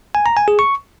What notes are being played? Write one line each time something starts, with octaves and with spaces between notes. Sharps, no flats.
G#5
A#5
G#5
G#4
C#6